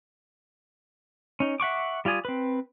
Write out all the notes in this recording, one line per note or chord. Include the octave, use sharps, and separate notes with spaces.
C#4 D#4
E5 F#5 C#6 D6
G3 F4 D5 G#5 D#6
C4 B4